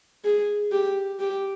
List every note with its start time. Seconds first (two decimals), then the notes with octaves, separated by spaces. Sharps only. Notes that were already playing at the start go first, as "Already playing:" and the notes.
0.25 G#4
0.72 G4
1.19 G4